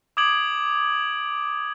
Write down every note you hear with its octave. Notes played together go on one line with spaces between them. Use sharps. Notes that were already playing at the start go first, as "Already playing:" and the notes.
D6 D#6 G#6 D7 F#7